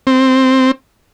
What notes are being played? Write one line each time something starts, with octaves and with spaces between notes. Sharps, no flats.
C4